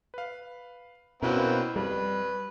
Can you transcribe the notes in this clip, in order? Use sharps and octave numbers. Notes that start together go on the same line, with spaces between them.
B4 F5
B2 A#3 C4 C#4 E4 F#4 B4
F2 G3 B4